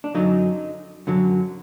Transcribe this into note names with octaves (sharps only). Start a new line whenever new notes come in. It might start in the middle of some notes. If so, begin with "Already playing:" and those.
D4
F#2 D3 F#3 D#4
F#2 D3 F#3